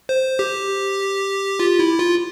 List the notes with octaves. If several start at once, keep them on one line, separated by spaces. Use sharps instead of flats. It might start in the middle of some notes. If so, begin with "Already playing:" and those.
C5
G4
F4
E4
F4